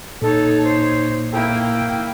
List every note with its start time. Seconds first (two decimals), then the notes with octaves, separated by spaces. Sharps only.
0.22 A#2 D#4 A4 C#5
0.64 C5
1.33 A#3 E4 G5